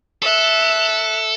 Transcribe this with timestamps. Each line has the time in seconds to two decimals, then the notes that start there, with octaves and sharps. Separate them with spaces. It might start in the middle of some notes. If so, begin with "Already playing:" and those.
0.22 A4 E5 F#6